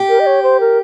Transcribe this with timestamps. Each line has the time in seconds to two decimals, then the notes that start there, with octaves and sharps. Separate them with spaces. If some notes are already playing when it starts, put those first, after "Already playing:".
Already playing: G4
0.09 A#4
0.20 D#5
0.26 C#5
0.43 C5
0.60 A#4